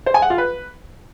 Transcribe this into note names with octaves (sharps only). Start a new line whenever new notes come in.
C5
G#5
F#5
F4
B4